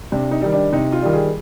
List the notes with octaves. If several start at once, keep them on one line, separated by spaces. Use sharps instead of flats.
C3 D4
D#4
D#3 G3 D#4
D4
C3 D#4
F4
D#3 G3
G#4